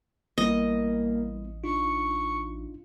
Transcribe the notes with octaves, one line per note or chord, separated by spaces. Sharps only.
A1 G3 A#3 B3 E4 D#5
D4 D#4 F4 C#6